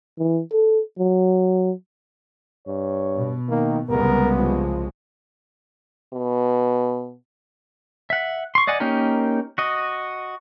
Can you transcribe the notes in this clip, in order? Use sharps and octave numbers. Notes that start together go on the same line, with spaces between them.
E3
A4
F#3
G2 C#5
B2
D#3 A#3
C2 C#3 G#3 B3 A#4
F3
B2
E5 F#5
C6 C#6
D5 D#5 F#5 G#5
A#3 C#4 D#4 G4 A#4
F#4 D#5